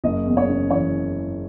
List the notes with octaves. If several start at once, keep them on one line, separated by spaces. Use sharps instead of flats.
F#1 D#5
E2
C#5
C#3
E3 C#5